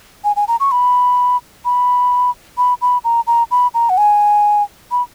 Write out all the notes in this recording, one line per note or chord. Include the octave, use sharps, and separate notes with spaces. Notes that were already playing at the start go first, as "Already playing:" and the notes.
G#5
G#5
A#5
C#6
B5
B5
B5
B5
A#5
A#5
B5
A#5
F#5
G#5
B5